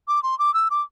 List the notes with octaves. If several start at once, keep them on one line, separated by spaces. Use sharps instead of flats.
D6
C6
D6
E6
D6